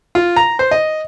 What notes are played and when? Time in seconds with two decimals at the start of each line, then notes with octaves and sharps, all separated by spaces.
0.15 F4
0.36 A#5
0.59 C5
0.71 D#5